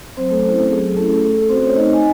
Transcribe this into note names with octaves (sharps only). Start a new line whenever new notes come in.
F#3 C4 C5
A3 A4
C4 C#4 E4 C5
A3 A4
F#3 G#4
A3 C#4 E4 A4
A3 A4
C4 C#4 F#4 C5
C#5
A3 D#4 D#5
G#5